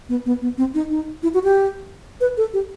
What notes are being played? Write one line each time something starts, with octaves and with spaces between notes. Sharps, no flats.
B3
B3
B3
C4
D#4
D#4
E4
F#4
G4
B4
A4
G4